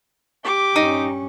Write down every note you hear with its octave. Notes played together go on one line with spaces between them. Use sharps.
G4 D6
G2 C#4 D#4